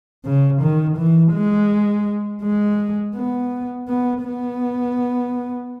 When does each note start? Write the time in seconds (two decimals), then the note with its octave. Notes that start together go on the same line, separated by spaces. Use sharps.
0.24 C#3
0.61 D#3
0.97 E3
1.33 G#3
2.42 G#3
3.15 B3
3.88 B3
4.24 B3